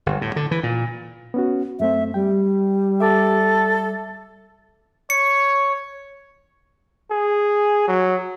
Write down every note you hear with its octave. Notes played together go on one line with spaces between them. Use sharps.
G1
A2
D3
E3
A#2
B3 C#4 F#4
F#2 A3 C4 E5
G3 G5
A4 E5 D6
C#5 C#7
G#4
F#3